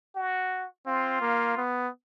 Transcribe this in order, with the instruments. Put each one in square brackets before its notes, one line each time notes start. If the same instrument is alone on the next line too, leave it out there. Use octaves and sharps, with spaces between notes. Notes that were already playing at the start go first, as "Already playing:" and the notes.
[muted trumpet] F#4
[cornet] C4 [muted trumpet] F4
[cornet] A#3
B3